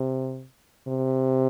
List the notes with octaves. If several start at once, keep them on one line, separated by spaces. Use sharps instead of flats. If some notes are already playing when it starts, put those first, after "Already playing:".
Already playing: C3
C3